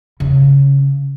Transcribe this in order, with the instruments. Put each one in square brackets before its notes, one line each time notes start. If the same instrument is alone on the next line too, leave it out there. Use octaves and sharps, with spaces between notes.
[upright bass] C#3